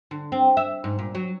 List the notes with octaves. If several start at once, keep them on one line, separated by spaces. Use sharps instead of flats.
D3
C4
E5
G#2
A#2
F#3